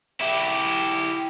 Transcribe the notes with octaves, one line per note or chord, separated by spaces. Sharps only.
E4 G4